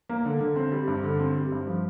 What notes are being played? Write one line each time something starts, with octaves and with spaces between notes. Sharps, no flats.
A#3
D3
D3
C4
G3
G2
D3
C4
G3
G2
F3